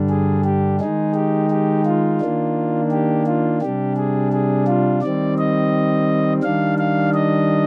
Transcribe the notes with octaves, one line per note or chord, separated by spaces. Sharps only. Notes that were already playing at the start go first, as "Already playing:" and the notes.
Already playing: G2 D3 G3 D4
G#4
G4
D#3 G#3 D#4 G#4
G4
G4
F4
D#3 A#3 D4
G4
F4
C3 G3 D4 G4
G#4
G#4
F4
D#3 G3 C4 D5
D#5
D#3 G3 D4 F5
F5
D#5